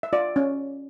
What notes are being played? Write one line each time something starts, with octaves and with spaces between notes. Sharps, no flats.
E5
F4 D5
C#4